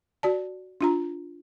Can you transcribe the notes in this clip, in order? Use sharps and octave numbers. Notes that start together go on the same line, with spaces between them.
F#4 D5 A5
D4 F4 A#5